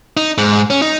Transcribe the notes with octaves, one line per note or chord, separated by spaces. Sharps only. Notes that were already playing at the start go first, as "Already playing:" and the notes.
D#4
G#2
C#4
D#4